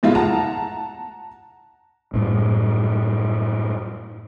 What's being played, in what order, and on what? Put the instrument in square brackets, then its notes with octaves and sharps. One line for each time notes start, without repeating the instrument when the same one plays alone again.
[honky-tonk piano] A2 G#3 E4 F4
F#5 A5 A#5
[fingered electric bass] F#2 A2 G3